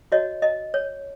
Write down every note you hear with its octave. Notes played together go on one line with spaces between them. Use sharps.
F#4 C#5 D#5
D#5
C#5